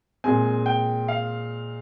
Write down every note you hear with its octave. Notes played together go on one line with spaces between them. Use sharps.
A#2 G#3 C4 G#5
G5
F5